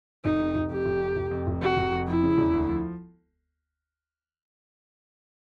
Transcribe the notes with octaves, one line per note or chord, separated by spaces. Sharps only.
F1 D#4
C3
F1
F2 G4
F1
C3
F1
F2
F1
C3 F#4
F1
F2
F3 E4
C#3
E1
D2
F3